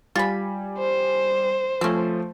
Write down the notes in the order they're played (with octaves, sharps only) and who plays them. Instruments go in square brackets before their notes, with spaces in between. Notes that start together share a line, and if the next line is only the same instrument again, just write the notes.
[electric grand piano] G3 G#5 [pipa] F4 B5
[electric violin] C5
[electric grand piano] F3 A3 [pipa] C4 C#4